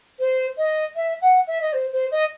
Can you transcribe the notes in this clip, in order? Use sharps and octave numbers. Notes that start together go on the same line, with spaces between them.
C5
D#5
E5
F#5
E5
D#5
C5
C5
D#5